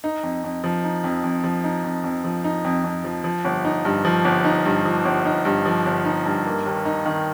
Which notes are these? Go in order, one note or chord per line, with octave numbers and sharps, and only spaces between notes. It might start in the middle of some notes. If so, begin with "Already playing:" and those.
D#4
F2
F2
F3
D#4
F2
F2
F3
D#4
F2
F2
F3
D#4
F2
F2
F3
F3
G1
D#4
G2
F3
G1
D#4
G2
F3
G1
D#4
G2
F3
G1
D#4
G2
A#3
D#2
D#4
D#3